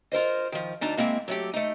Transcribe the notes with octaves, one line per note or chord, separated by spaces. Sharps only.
F4 A#4 C5 D#5
D#3 F3
D2 D4 D#4 A5 A#5
G#3 A#3 C4 E4
F#3 A3 G4
A3 D#4